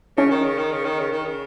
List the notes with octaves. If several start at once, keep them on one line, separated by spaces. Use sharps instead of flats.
C#3 C#4
D#3
C#3
D#3
C#3
D#3
C#3
D#3
C#3